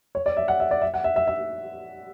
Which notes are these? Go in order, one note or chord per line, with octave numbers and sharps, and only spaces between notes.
C#5
D5
E5
F#5
E5
D5
E5
F#5
E5
E5
E5